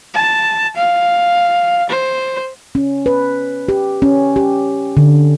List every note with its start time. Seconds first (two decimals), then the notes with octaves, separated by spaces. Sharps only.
0.14 A5
0.76 F5
1.90 C5
2.75 C#4
3.06 B4
3.69 G4
4.02 C#4
4.36 G4
4.97 D3